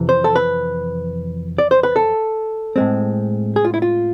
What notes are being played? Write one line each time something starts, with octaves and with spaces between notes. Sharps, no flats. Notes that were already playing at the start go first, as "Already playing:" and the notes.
Already playing: F2 C3 E3
C5
A4
B4
D5
C5
B4
A4
A2 G#3 C4
G#4
F4
E4
F4